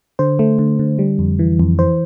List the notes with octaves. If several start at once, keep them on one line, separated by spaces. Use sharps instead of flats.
D3 C5
A3
D3
D3
G3
F2
E3
F2
E3 C5